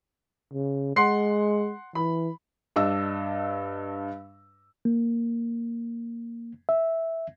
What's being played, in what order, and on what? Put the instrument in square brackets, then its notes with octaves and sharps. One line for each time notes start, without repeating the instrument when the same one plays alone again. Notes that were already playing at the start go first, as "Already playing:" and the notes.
[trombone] C#3
[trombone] G#3 [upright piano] F#5 C6 C7
[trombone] E3 [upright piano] B5
[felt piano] G2 D4 D#5 E6
[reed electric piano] A#3
E5